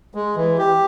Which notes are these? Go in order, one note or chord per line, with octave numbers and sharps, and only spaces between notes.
G#3
E3
G4